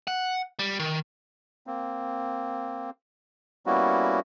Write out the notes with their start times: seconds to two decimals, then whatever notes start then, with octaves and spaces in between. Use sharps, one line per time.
0.07 F#5
0.59 G3
0.79 D#3
1.67 A#3 C4
3.66 G3 A#3 B3 C#4 E4 F#4